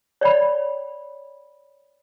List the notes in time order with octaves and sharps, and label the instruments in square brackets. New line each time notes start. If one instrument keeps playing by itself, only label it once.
[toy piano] C#5 D5 G5 B5